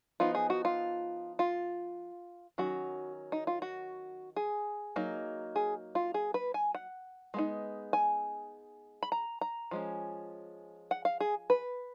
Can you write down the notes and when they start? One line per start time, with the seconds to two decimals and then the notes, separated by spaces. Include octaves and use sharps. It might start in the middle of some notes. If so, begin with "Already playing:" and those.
0.20 F3 B3 D#4 F4
0.35 G#4
0.50 F#4
0.65 F4
1.39 F4
2.58 D#3 F#3 C#4 F#4
3.32 D#4
3.47 F4
3.62 F#4
4.36 G#4
4.96 F#3 A#3 D#4
5.56 G#4
5.95 F4
6.14 G#4
6.34 B4
6.54 G#5
6.75 F#5
7.34 G#3 B3 D#4
7.93 G#5
9.03 B5
9.12 A#5
9.41 A#5
9.71 F3 G#3 C#4
10.91 F#5
11.05 F5
11.20 G#4
11.50 B4